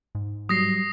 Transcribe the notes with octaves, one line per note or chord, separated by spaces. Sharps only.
G#2
F#3 G3 D#6 A#6 C7